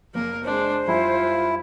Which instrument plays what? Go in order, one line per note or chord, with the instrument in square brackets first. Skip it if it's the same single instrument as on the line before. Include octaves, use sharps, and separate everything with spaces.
[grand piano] F#1 [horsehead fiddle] A#3 A#4
[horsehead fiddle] G#3 D4 [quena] C5
[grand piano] F#2 G3 G#5 [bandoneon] E4 [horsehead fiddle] F4